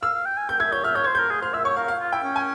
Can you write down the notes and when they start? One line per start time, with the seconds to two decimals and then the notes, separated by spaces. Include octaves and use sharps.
0.02 F5 E6
0.14 F5
0.26 G5
0.37 G#5
0.49 G5 G6
0.60 E5 G#6
0.72 C#5 G6
0.84 E5 F6
0.95 C#5 G6
1.04 C5 G#6
1.15 G6
1.19 A#4
1.30 G#4
1.42 C5 F6
1.54 E5 E6
1.65 C#5 C#6
1.76 A#4 F5
1.88 F5
2.00 F4
2.12 E4 G5
2.23 C#4
2.36 G#5